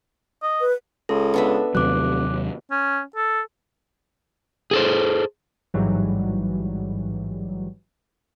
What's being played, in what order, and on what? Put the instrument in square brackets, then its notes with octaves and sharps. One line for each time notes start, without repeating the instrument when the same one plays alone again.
[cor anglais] D#5
[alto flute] B4
[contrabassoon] C#2 [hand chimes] A4
[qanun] B3 D4 E5
[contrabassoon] F1 [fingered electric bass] D#2 C3 F#3 [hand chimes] D6 F#6
[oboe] C#4
A4
[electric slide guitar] G#4 A4 C5
[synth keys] A1 G#2 E3 F#3 G3